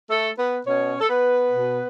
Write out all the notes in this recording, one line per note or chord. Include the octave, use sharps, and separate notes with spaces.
A3 A4
B3 B4
B2 C#4 C#5
A4
B3 B4
B2